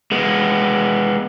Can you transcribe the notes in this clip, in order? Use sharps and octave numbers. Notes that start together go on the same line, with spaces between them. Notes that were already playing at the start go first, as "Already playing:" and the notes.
G#3 B3